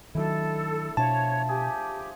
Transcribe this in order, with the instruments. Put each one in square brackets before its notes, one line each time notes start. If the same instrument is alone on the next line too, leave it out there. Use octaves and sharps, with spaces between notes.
[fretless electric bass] D#3 F#3 [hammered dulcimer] A3 D4 E4 [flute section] A4
[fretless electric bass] B2 D4 [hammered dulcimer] F3 E5 [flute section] C#5 [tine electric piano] A5
[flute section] G4 [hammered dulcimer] G#4